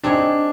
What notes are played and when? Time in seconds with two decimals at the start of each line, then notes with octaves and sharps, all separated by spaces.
0.04 C4 D4 D#4 G#4 C#5